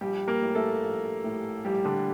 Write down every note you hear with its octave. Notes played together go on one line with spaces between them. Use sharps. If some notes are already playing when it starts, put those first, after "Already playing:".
A#1 G3 G4
A#3 A#4
A2
A3 A4
A#1
A2
A#1 G3 G4
D3 D4